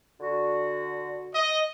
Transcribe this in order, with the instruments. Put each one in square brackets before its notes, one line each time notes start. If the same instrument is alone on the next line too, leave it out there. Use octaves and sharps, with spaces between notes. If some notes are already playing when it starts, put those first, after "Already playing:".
[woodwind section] D3 F#4
[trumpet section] D#5